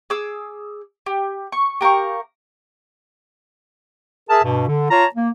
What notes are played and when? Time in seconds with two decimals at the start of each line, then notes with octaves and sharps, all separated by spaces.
0.10 G#4 D6 E6
1.06 G4
1.52 C#6
1.81 G4 A#4 F5 C#6
4.30 G#4 A#4 E5 A5
4.44 G2 B2
4.68 D3
4.90 F4 C#5 A5 A#5
5.14 A#3